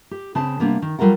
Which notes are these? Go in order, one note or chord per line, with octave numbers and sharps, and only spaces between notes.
G4
C#3 C4 B4 A5
C3 G3 A#3 B3 D4
D#3
F#3 G3 F4 A4 A#4 F#5